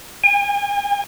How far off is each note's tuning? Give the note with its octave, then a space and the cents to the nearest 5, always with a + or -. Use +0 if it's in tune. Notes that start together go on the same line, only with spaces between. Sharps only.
G#5 -40